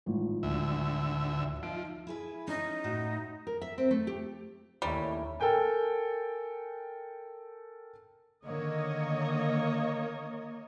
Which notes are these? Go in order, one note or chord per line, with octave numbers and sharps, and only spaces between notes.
G#1 A2 F3
D2 E5
F3 D#4 E5 D7
E4 G#4 B4
C#4 D#4
A2 F#4
A#4
E5
C4
A3
G4
D#2 A2 D#3 G3 C#4 A#4
A4 A#4 G5 G#5
D3 D#3 A#3 C#5 D#5